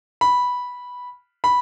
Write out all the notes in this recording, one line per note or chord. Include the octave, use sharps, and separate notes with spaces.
B5
B5